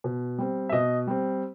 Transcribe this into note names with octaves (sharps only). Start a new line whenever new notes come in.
B2
G3 C4
E5
B2 D#5
G3 C4